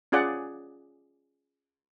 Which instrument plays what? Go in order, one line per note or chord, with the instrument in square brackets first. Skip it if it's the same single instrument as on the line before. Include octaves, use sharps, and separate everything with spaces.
[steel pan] C#4 F4 G#4 D5 F#5